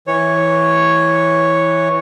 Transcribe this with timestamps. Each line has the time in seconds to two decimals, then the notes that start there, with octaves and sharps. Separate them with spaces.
0.07 E3 C#5